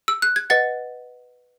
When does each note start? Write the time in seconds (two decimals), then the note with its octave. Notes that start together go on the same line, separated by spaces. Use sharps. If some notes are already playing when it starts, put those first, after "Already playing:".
0.08 E6
0.22 F#6
0.36 G#6
0.50 B4 D#5 F#5 A6